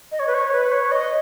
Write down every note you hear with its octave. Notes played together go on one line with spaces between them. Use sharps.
D#5
C#5
B4
C#5
B4
C#5
D#5